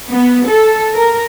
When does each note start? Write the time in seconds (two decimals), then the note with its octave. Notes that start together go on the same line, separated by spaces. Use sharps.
0.11 B3
0.48 A4
0.94 A#4